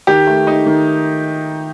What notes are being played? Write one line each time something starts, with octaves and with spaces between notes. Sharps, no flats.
D#3 G4
A3
D#4
D#3